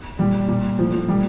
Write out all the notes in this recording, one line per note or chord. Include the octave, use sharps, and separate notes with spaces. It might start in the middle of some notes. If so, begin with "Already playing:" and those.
A#2 G3
A#2
A2 F3
F3
A#2 G3